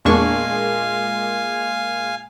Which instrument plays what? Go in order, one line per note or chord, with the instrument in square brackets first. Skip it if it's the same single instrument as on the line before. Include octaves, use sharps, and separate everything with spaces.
[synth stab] E2 D4 C#6 [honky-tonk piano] A#2 G#3 A#3 [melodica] F5 G#5